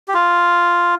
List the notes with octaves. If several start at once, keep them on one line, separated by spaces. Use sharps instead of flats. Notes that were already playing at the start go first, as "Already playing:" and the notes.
G4
F4